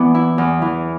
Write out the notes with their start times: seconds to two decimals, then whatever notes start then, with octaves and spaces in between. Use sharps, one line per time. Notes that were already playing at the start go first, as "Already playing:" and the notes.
Already playing: E3 B3 D5
0.15 E4
0.38 E2
0.62 E3